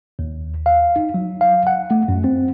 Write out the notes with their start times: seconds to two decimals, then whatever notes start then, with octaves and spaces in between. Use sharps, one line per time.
0.19 D#2
0.66 F5
0.96 D#4
1.14 F#3
1.41 F5
1.67 F#5
1.91 A3
2.08 F#2
2.24 C4